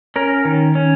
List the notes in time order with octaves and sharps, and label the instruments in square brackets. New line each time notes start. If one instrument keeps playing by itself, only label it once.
[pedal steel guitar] C#4 A#4
D#3
C#4